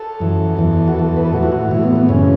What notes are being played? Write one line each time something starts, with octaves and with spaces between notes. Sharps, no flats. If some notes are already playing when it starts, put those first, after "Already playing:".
Already playing: A4
F#2 E3
E2 E3
F#4
E2 E3 A4
B4
A4
A2 E3 F#4
E4
F#4
A2 E3 E4
B3
B3
F#2 C#3 E3 C#4